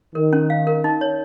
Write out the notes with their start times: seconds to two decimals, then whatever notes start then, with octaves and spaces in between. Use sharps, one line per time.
0.15 D#3 A#4
0.33 C#4
0.50 F5
0.67 A#4
0.84 D#4
1.01 C#5